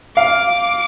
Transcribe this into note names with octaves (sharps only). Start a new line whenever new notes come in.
F5 D6